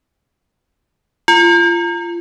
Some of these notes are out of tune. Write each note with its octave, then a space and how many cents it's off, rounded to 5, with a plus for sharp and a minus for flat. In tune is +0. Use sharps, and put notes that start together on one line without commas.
F4 -30